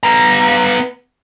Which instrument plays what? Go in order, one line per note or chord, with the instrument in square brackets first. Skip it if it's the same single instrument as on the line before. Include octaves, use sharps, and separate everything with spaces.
[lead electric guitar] B3 A#5